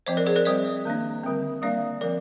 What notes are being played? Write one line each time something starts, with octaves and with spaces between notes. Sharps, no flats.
F3 C4 C5 D#5
A#4 D5
G#4 C5
A#4 D5
G3 C4 C5 D#5
D#3 A#3 D4
D3 G3 C4
G3 A#3 D4 D5 F5
F3 C4 A#4 D5